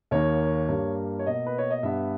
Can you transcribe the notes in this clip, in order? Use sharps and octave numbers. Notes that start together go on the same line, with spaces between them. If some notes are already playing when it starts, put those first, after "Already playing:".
D#2 D#3 A#3 C#5
G2 G3 A#3
C#5
B2 A#3 D#5
B4
C#5
D#5
G2 G3 B3 E5